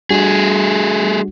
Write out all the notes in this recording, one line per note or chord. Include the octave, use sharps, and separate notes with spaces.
G3 A3 D4 F#4 G#4